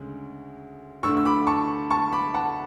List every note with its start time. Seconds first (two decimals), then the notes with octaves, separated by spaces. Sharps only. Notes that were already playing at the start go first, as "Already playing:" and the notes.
Already playing: D2 C#3 G#3
1.03 D2 D3 A3 D4 C#6 E6
1.17 E6
1.25 B5 D6
1.47 A5 C#6
1.90 A5 C#6
2.13 B5 D6
2.34 F#5 A5